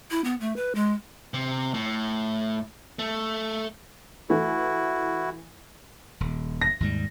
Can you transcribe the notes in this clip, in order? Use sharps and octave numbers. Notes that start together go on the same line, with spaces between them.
E4
B3
A3
B4
G#3
C3
A2
A3
E3 A3 E4 F#4
D#1
A#6
D#2 G#2 G3